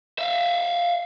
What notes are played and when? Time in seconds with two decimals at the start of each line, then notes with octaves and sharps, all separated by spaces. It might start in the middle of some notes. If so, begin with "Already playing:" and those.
0.19 E5 F5